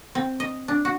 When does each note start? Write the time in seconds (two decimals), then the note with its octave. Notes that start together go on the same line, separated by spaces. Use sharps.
0.15 C4
0.40 D#5
0.68 D4
0.85 F#4